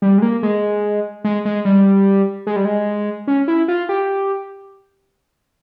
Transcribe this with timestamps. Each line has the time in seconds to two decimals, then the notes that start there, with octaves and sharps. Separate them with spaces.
0.02 G3
0.18 G#3
0.22 A#3
0.43 G#3
1.24 G#3
1.45 G#3
1.65 G3
2.47 G#3
2.56 G3
2.65 G#3
3.28 C#4
3.48 E4
3.68 F4
3.89 G4